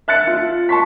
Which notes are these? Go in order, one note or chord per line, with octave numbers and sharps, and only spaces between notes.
E5 F#6 A6 C#7
F4
A5 C6 C#6 B6